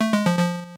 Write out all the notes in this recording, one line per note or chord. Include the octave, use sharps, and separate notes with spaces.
A3
G#3
F3
F3